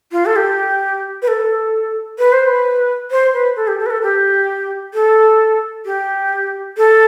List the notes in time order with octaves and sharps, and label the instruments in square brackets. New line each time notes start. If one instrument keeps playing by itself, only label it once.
[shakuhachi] F4
A4
G4
B4
A4
B4
C5
B4
C5
B4
A4
G4
A4
B4
A4
G4
A4
G4
A4